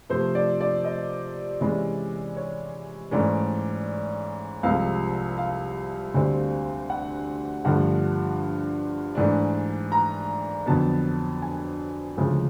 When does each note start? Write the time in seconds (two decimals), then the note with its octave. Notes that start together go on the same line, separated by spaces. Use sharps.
0.10 C3 F3 A3 C5
0.35 D5
0.61 D5
0.85 D#5
1.61 C3 E3 G#3 C#4 D5
2.37 C#5
3.11 G#2 E3 A3 C#4 D5
4.63 C2 C3 F3 G#3 F5
5.38 F5
6.14 D2 D3 G3 C4
6.90 F#5
7.65 G2 D3 F3 A3 F#5
9.15 G#2 E3 A3 D4
9.92 A#5
10.66 F2 D3 F#3 B3 A5
11.42 G#5
12.17 D2 C#3 F3 G#3